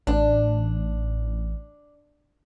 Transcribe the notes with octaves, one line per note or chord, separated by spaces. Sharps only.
A1 D4